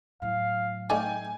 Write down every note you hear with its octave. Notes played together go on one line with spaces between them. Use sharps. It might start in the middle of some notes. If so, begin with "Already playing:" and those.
A2 F#3 F5
A3 D#4 D5 G5 G#5